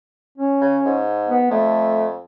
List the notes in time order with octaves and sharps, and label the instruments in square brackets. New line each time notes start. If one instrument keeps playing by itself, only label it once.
[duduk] C#4
[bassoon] C#3
G#2
[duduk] B3
[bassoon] F2 [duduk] A3